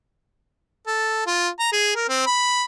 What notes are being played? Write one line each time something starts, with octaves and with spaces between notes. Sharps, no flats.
A4
F4
A#5
G#4
A#4
C4
B5